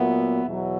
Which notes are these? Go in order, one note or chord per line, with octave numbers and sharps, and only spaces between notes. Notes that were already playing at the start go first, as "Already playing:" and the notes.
Already playing: A#2 F#3 B3 E5
E2 B2 F#3